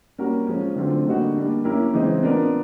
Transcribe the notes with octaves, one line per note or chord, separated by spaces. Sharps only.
G3 A#3 C#4 F#4 A#4
F3 G#3 C#4
D3 F#3 A3 C4 F4
D3 G3 A#3 D#4 F#4
G3 A#3 D4
A#3 C#4 E4 G4 A#4
C#3 E3 G#3 C4 D#4
B3 D4 F4 A#4